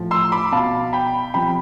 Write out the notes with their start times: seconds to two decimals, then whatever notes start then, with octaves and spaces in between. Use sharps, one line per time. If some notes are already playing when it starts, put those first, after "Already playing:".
Already playing: A2 F3
0.11 C6 E6
0.32 B5 D6
0.52 B2 F5 A5
0.93 G5 B5
1.34 C3 F3 G5 B5